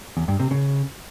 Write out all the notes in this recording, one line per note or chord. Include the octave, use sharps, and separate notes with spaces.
E2
G2
C3
C#3